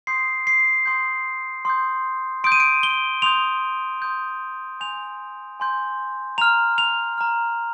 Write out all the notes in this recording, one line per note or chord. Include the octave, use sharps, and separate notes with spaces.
C6 D#6 G6 C7
C7
C6 D#6 G6
C6 D#6 G6
C6 D#6 G6 D7
D#7
D7
G7
C6 D#6 G6 F7
C6 D#6 G6
G#5 C6 G6 F7
G#5 C6 G6
A#5 F6 F7
F7
A#5 F6